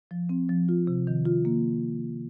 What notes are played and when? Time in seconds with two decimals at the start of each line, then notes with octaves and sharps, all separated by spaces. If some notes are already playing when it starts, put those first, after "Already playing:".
0.11 F3
0.29 C4
0.49 F3
0.69 F4
0.87 C3
1.07 D#3
1.25 F4
1.45 A#3